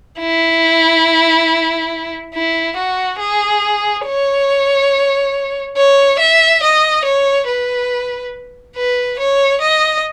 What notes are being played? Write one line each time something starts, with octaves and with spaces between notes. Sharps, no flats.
E4
E4
F#4
G#4
C#5
C#5
E5
D#5
C#5
B4
B4
C#5
D#5